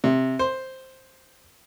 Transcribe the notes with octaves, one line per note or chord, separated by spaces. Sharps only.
C3
C5